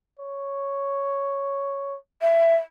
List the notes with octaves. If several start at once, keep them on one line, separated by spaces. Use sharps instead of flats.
C#5
E5